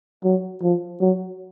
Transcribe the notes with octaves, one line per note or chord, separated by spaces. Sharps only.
F#3
F3
F#3